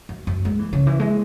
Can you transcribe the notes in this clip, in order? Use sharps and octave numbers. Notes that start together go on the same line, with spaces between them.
F#2
F#2
G#3
E3
C#3
E3
G#3